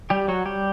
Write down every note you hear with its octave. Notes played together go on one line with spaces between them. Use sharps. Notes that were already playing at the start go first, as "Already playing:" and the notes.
G3 G4
F#3 F#4
G3 G4